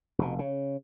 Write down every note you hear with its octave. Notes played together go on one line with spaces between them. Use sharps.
F1 B2
C#3